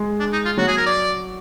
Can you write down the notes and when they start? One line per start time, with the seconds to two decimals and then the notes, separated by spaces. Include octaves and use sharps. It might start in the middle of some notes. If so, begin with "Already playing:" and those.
Already playing: G#3
0.20 D4
0.32 D#4
0.45 F4
0.57 F#3 F#4
0.67 G#4
0.77 A#4
0.86 D5